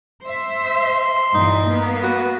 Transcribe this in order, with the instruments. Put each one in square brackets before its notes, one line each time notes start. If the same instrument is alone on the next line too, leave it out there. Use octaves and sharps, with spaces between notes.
[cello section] C5 E5
[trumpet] C6
[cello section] G2 A#2 E3 [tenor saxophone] D#4
[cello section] A#3 B3
[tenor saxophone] F#4 [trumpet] B4